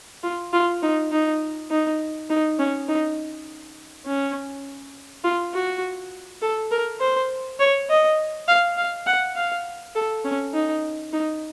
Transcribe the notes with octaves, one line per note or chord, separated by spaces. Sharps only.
F4
F4
D#4
D#4
D#4
D#4
C#4
D#4
C#4
F4
F#4
A4
A#4
C5
C#5
D#5
F5
F5
F#5
F5
A4
C#4
D#4
D#4